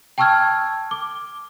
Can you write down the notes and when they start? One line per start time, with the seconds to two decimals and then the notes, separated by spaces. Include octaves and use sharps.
0.18 G5 A5 C#6 E6 F6 G#6
0.91 D6